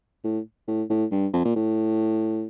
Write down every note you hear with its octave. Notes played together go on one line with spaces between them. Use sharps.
A2
A2
A2
G2
F2
A#2
A2